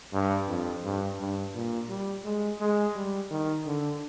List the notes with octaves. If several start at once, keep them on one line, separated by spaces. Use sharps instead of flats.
G2
F2
G2
G2
A#2
G3
G#3
G#3
G3
D#3
D3